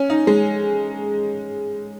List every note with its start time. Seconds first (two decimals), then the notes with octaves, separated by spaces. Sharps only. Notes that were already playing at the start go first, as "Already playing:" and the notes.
Already playing: C#4
0.10 D#4
0.27 G#3